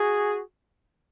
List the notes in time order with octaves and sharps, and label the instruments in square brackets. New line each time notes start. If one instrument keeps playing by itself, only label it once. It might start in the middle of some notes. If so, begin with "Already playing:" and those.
Already playing: [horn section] F#4 G#4